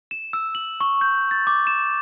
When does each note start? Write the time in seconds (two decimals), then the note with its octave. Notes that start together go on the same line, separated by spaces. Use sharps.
0.11 E7
0.33 E6
0.55 F#7
0.81 C#6
1.01 G6
1.31 A6
1.47 D6
1.67 E7